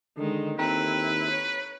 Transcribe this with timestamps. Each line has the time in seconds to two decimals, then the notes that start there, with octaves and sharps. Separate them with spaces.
0.18 D3 D#3 G#3
0.59 D#2 C4 E4 A4 B4 G5 A#5
1.31 C#5